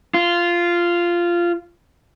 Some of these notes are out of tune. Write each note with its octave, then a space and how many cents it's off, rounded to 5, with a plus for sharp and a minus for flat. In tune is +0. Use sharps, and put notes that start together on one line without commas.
F4 -10